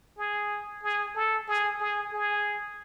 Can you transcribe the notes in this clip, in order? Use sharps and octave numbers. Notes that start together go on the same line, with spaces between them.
G#4
G#4
A4
G#4
G#4
G#4